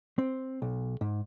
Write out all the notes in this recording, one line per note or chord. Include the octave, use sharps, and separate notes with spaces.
C4
B1
G#2